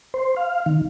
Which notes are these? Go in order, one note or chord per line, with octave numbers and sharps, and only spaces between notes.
C5
F5
D#3